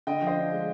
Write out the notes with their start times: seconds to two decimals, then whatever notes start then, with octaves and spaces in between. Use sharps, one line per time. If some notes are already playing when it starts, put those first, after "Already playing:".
0.07 D3 D#5 G5
0.22 F3
0.27 C5 D#5
0.37 D4
0.52 G#3